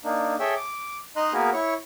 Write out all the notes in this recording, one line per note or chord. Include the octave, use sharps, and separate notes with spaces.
A#3 D4 D#4
G#4 A4 C#5 E5 G5 E6
D6
D#4 D#5 A#5 C6 F#6
A#3 B3 F#4 G#4 A#4 B4
E4 C#5 C#6